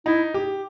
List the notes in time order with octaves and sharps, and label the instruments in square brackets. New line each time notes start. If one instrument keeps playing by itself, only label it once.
[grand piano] D#4 [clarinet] E4
[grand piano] G4